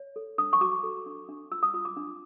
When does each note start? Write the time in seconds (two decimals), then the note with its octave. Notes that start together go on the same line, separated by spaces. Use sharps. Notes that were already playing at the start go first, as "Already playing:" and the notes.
Already playing: C#5
0.16 A4
0.38 D4 D#6
0.53 C#6
0.61 F#4 D6
0.83 A4
1.06 D4
1.29 D4
1.51 F4 E6
1.63 D#6
1.74 F4 D#6
1.85 D6
1.97 D4